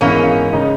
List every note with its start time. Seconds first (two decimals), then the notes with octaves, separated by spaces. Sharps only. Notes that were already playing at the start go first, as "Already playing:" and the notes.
0.01 G#2 E3 A#3 B3 C#4
0.53 C#3 G#3 D#4